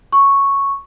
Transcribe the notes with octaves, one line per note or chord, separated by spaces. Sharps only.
C#6